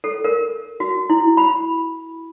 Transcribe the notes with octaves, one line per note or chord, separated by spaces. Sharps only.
A4
A#4
F#4
E4
B5